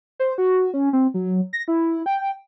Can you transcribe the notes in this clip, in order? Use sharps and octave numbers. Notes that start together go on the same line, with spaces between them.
C5
F#4
C#4
C4
F#3
A#6
E4
G5